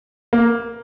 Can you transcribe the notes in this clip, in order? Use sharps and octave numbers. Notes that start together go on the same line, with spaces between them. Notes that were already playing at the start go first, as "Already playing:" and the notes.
A#3